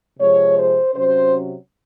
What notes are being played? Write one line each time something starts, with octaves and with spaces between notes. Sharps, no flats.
C3 F3 G#3 C4 C#5
C5
C3 F#3 C#4 C5